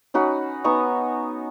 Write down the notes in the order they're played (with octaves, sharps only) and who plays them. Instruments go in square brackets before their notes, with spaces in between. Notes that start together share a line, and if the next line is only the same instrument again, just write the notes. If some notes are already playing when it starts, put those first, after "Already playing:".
[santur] C#4 D#4 F#4 B4
B3 D#4 G#5 C#6